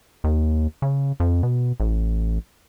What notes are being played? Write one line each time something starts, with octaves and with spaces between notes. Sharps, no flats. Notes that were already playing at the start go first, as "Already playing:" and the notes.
D#2
C#3
F2
B2
A1